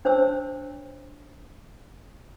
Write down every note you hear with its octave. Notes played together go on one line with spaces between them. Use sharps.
D4 C5 C#5 A5 E6